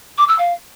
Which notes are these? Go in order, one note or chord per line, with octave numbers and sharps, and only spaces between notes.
D6
E6
F5